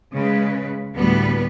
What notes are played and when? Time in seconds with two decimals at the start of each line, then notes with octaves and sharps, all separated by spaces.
0.13 C#3 G#3 B4
0.95 D2 A2 G3 B3 B4